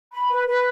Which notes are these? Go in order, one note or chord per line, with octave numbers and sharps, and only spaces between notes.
B5
B4
B4